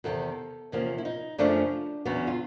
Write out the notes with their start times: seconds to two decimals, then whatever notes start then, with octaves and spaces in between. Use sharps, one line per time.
0.04 E2 C3 D#3 A4
0.72 E2 C3 F3 A#3 C#4
0.98 E4
1.05 D#4
1.38 F#2 C#3 F3 A3 C#4 D4
2.05 E2 C#3 F#3 B3
2.27 F4